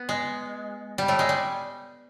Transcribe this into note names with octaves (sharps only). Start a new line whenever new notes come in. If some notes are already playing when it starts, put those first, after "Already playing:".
Already playing: B3
G#3
G3
A2 A3
G#3
G3